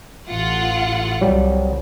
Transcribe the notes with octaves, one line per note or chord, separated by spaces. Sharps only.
A1 F4 F#5
C2 F#3 G3